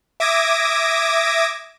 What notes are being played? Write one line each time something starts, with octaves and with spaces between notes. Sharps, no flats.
E5 D6 D#6 G#6 A#6